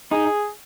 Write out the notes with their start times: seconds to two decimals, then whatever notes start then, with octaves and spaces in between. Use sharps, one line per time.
0.11 D#4 G#4